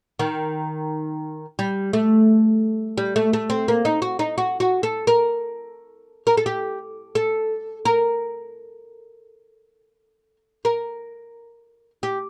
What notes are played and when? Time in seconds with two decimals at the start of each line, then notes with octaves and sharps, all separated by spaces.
0.19 D#3
1.59 G3
1.93 A3
2.98 G3
3.16 A3
3.33 A3
3.50 C4
3.68 A#3
3.85 D#4
4.02 F#4
4.19 D#4
4.38 F#4
4.60 F#4
4.83 A4
5.07 A#4
6.27 A#4
6.37 A4
6.46 G4
7.15 A4
7.85 A#4
10.65 A#4
12.03 G4